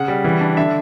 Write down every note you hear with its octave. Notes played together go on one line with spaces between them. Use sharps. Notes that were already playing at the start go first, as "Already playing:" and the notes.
Already playing: C#3 F#5
G3
E3
D4
D3 E5